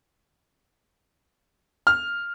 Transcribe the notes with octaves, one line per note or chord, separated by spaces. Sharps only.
F6